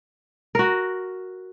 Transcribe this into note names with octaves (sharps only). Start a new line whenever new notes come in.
F#4 A#4